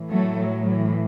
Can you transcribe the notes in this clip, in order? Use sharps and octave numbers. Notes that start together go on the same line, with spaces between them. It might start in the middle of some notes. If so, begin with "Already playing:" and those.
Already playing: A2 E3
F#3 A3
F#3
E3